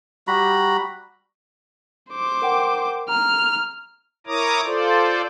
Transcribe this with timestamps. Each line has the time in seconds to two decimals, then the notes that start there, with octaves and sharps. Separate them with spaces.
0.28 G3 F#4 A#5 B5
2.10 C5 D6
2.42 A#4 F#5 G5
3.09 A#5 F6
4.27 E4 A#4 C#5 A#5 D6 D#6
4.65 F4 A4 C5 D5